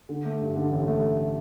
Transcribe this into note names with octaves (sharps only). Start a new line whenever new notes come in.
D3
A3
G2
D3
A1
A3